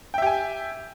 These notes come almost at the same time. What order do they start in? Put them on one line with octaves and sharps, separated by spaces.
G5 E5 G4 G#5